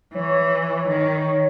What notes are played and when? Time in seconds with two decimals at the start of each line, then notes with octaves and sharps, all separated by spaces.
0.14 E3 C#5
0.88 D#3